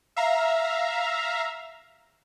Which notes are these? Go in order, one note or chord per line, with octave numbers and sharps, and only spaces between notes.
E5 F5 A#5